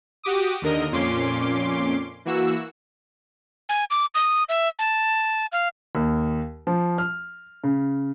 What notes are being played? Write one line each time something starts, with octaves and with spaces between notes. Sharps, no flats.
F#4 G4 D6 D#6
D#2 D3 A#4 D#5
F2 A#2 C#4 C6 D6 C7
E3 A#3 F#4 E6
G#5
D6
D#6
E5
A5
F5
D#2
F3
F6
C#3